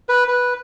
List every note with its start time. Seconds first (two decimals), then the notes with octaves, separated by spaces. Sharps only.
0.09 B4
0.28 B4